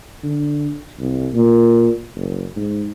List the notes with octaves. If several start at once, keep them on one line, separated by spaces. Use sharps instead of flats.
D3
C2
A#2
F#1
G#2